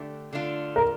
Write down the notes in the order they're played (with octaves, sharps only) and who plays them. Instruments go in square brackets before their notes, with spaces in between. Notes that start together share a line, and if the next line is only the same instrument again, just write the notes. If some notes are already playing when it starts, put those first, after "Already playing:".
Already playing: [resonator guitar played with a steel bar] D3 A3 D4 G4
D3 A3 D4 F4
[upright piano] A#4